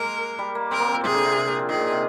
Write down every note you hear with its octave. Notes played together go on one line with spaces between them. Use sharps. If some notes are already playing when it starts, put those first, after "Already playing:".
Already playing: G#3 A#3 A#4
G3
A#3
C4 A#4
A#3
C4
F3
C3 G#4
D3
C3
C3
A#2
F3
D#3 G#4
A#2
C3